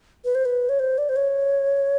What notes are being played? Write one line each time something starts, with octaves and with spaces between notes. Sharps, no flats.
B4
C5
B4
C#5
C5
D5
C5
C#5